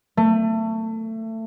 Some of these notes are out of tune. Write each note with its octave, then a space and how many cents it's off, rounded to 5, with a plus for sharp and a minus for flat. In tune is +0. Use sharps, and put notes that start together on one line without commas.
A3 +25